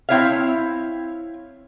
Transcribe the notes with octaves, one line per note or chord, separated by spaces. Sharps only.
C4 E4 C#5 E5 F5